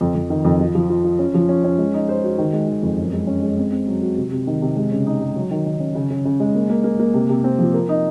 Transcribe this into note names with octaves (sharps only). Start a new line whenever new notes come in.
F2
F2
D#3
F2
F3
F3
F4
F4
C#4
F3
C#4
C#4
G#3
D#4
C5
F#4
D#3
G#3
D#3
F2
F#2
G#3
C#4
G#3
C4
C4
F#3
F#4
C3
C3
D#3
C3
G#3
C#3
D#4
G#3
F#3
D#3
D#3
C#4
C#3
C#3
C#3
G#3
A#3
A#3
A#3
A#3
C3
C3
C4
F3
A#4
D#4